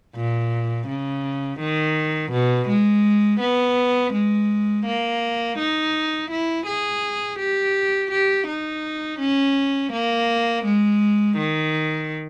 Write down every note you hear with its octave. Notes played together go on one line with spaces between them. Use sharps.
A#2
C#3
D#3
B2
G#3
B3
G#3
A#3
D#4
E4
G#4
G4
G4
D#4
C#4
A#3
G#3
D#3